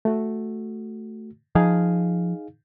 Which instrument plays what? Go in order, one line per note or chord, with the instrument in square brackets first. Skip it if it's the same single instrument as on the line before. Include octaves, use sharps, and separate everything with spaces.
[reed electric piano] A3 F#4
[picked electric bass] F3 [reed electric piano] D#4 G#4 F5